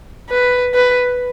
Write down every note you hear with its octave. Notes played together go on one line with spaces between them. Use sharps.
B4
B4